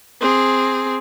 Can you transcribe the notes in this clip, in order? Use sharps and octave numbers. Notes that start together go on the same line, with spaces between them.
C4 G#4